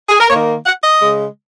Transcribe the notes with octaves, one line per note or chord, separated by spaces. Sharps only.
G#4
A#4
D#3 A#3 C#5
F#5
D#5
C#3 G#3